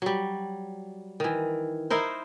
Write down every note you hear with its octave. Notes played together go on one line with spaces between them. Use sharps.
F#3 G3
D#3 E3
D#4 E4 A#4 C5